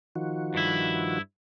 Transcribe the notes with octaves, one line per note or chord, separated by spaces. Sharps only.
D#3 F3 F#4
G2 E4